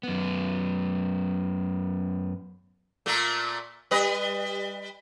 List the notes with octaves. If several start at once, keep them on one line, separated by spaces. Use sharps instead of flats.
F#2 B3
A#2 A3 A#3
G3 B4 D#5